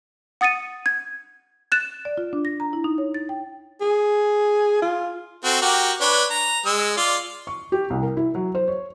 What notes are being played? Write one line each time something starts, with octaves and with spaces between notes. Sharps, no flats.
F#5 D#6 A6 C#7 D#7
G#6
F#6 A6 E7
D5
F4
D4
A#6
A#5
E4
D#4
C#5
A6
G5
G#4
F4
C4 F#4 A4
F#4 G4 A#4
D4 B4 C#5
A#5
G#3 E6
F4 D5
C#6
G4
C2
A#4
E4
F#3
C5
C#5